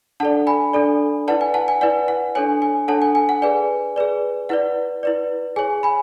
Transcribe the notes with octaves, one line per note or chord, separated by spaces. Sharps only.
D4 A4 D5 F#5 A5
G#5 B5
D4 A4 D5
E4 B4 D5 F#5 A5
G#5
F#5 A5
G#5
E4 B4 D5 F#5
F#5
D4 A4 C#5 G#5
G#5
D4 A4 C#5 F#5 A5
G#5
G#5
F#5
G#4 B4 D5 G#5
G#4 B4 D5
E4 B4 D5 F#5
E4 B4 D5
G#4 C#5 G#5
G#5 B5